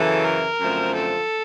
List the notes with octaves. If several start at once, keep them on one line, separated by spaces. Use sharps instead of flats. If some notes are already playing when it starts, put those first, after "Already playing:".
Already playing: F#2 C#3 E3 A4
A#4
F#2 D3 F3 A3 C4
A4